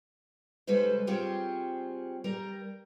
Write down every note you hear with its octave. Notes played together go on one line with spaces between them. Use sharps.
C#3 G3 G#3 A4 B4 C5
G3 C4 F4 G4 G#4 C#5
G3 A#4 A#5